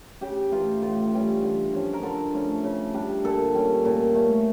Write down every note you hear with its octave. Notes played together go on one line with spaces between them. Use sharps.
C#3 G4
E3 A3 F4
A2 F4
E3 G3 C#4
D3
F3 C#4
A#4
D3 A4
F3 A3 C#4
C#3
G3 D4
A#2 A4
G3 C#4
A#2
A3 C#4